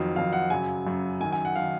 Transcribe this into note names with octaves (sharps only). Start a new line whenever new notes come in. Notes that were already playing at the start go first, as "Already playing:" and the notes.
Already playing: F2 D#3 F#3
F2 D#3 F#3 F5
F#5
F#2 C#3 F#3 G#5
F#2 C#3 F#3
F#2 D#3 F#3 G#5
G#5
F#5
D#3 F#3 F5